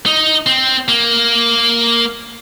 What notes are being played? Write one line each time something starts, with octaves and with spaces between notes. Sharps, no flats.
D#4
C4
A#3